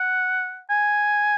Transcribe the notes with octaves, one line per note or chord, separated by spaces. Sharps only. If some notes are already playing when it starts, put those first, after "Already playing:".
Already playing: F#5
G#5